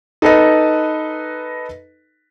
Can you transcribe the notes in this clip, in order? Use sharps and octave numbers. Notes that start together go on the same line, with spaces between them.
D#4 A4 B4 D#5